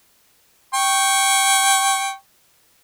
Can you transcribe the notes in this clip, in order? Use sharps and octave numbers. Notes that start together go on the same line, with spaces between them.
G5 C#6